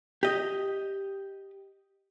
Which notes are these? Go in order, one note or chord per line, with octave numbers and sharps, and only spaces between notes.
G4 D#5